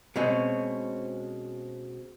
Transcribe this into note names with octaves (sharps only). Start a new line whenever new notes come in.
B2 G#3 C4 C#4